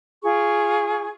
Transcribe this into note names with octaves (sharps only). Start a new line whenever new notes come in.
F4 G#4 C#6